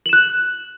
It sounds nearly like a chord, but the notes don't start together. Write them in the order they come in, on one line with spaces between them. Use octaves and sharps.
F#7 E7 F#6